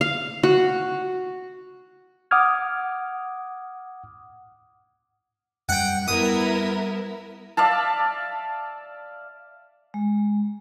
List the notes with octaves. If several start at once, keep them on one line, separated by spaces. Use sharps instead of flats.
F5
F#4
F#5 D6 D#6 F6 G#6
F#2 G3 F#5 G5
G3 B3 E4 A#4 D#6
D5 E5 F5 A5
G#3